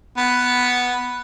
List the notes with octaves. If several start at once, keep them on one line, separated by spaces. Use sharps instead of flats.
B3